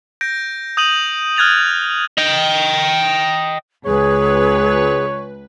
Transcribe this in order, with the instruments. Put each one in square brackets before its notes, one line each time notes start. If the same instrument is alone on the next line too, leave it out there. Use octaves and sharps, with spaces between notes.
[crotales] G6 A#6 D7
D#6 G6 D#7 F#7
F6 F#6 G#6 A6 F7 F#7
[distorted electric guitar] D#5 G5
[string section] C#2 B4 [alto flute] G#4 [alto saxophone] C#5